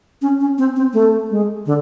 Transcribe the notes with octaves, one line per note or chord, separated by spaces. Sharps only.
C#4
C#4
C4
C4
A3
G#3
D3